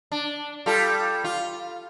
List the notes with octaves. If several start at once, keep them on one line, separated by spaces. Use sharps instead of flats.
D4
G3 F4 A4
F4